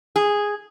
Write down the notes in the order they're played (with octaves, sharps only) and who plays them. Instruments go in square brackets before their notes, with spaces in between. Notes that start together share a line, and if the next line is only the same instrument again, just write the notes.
[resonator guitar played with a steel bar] G#4